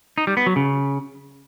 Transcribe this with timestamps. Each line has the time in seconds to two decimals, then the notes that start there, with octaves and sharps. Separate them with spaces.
0.18 D#4
0.27 G3
0.37 B3
0.46 F#3
0.56 C#3